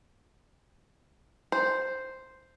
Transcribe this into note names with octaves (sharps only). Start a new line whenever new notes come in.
C5